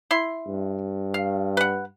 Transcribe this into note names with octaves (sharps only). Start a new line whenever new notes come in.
E4 C6
G2
F5
B4 F#5